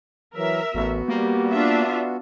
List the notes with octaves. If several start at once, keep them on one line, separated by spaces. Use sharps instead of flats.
E3 F#3 A#4 E5
A1 B3 F#4
G3 A#3
D4 F4 E5